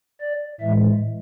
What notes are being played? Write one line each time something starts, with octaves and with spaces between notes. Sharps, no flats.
D5
A2 E3 G#3 E5